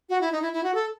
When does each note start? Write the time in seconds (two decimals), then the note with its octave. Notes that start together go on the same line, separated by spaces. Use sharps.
0.09 F#4
0.21 E4
0.32 D#4
0.42 E4
0.53 E4
0.63 F#4
0.74 A4